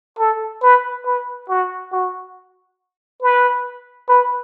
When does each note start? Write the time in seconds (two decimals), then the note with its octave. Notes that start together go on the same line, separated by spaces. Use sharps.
0.18 A4
0.62 B4
1.05 B4
1.49 F#4
1.92 F#4
3.22 B4
4.08 B4